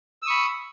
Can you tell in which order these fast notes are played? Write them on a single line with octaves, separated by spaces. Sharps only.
E6 D#6 C#6 B5